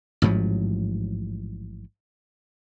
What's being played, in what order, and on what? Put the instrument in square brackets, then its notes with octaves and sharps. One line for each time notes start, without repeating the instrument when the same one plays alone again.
[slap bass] A1 G#2 F3 F#3